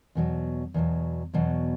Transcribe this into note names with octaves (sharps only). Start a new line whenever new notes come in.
E2 B2 F#3
E2 B2 F#3
E2 B2 F#3